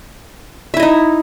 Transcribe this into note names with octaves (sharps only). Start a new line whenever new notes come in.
D#4 E4 D#5 E5